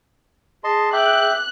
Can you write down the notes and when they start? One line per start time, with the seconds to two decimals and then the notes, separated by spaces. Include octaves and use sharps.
0.64 G#4 D#5 A5 C6
0.93 E5 G5 D6 F#6